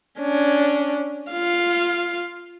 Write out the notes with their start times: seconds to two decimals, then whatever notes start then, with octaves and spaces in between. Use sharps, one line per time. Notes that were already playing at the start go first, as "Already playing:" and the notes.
0.20 C#4 D4
1.32 F4 F5